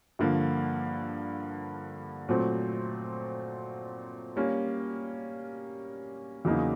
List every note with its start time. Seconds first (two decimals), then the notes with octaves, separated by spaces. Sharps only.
0.19 G2 D3 F3 A#3
2.29 A#2 F#3 A3 C4
4.36 G3 A#3 C#4
6.45 E2 C#3 F#3 A#3 D#4